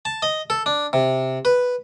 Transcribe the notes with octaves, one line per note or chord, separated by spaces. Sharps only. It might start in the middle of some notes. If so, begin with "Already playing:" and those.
A5
D#5
A4
D4
C3
B4